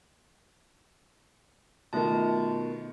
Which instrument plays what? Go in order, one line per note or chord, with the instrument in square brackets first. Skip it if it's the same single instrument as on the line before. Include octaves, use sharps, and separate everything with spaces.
[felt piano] B2 D#3 [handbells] A3 F4 A5